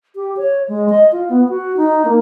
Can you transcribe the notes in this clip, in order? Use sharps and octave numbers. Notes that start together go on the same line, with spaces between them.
G4
C#5
G#3
D#5
F4
B3
F#4
D#4
A#3